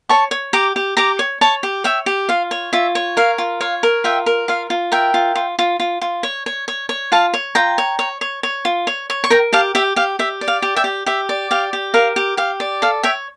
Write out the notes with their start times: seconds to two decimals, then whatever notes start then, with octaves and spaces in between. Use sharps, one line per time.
0.09 C#5 A5 C#6
0.31 C#5
0.53 G4 A#5 D6
0.76 G4
0.97 G4 A#5 D6
1.19 C#5
1.41 C#5 A5 C#6
1.63 G4
1.84 C#5 E5 G5
2.06 G4
2.29 F4 F5
2.51 C#5
2.73 F4 E5
2.95 C#5
3.17 A#4 F5
3.38 F4
3.61 C#5 F5
3.83 A#4
4.04 F4 E5 G5
4.26 A#4
4.48 F4 F5
4.70 F4
4.92 A#4 E5 G5
5.14 F4
5.35 F4
5.59 F4
5.80 F4
6.01 F4
6.23 C#5
6.46 C#5
6.68 C#5
6.89 C#5
7.12 F4 F5 A5
7.34 C#5
7.55 F4 G5 A#5
7.78 C#5
7.99 C#5
8.21 C#5
8.43 C#5
8.65 F4
8.87 C#5
9.10 C#5
9.24 C#6
9.30 A#4 G5 A#5
9.53 G4 F5 A5
9.75 G4 E5 G5
9.96 G4 F5
10.19 G4 E5
10.41 D5
10.48 F5
10.62 G4
10.76 E5 G5
10.84 G4
11.06 G4 E5
11.29 D5
11.51 G4 F5
11.73 G4
11.94 A#4 F5
12.16 G4
12.37 G4 F5
12.60 D5
12.82 A4 F5
13.03 C#5 E5 G5